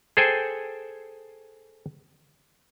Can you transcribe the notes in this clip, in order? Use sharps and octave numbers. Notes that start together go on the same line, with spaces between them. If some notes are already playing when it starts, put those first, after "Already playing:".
G#4 A4 C5 G5 G#5